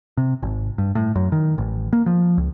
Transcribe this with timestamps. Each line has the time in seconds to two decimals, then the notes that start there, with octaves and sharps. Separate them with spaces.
0.17 C3
0.43 G#1
0.78 G2
0.95 A2
1.16 F#2
1.32 D#3
1.58 A1
1.93 A#3
2.06 F3
2.38 C#2